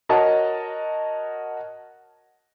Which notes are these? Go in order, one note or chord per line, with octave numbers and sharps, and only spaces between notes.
F#4 A#4 C#5 D#5 A5